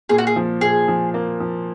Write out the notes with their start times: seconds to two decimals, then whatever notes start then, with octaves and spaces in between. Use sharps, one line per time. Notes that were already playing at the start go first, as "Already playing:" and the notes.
0.09 A#2 G#4
0.18 F#4
0.27 G#4
0.36 F3
0.61 A#2 G#4
0.88 F3
1.14 A#3
1.40 F3